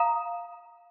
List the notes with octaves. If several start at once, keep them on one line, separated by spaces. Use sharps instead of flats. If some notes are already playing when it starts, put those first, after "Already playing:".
Already playing: F5 A#5 D#6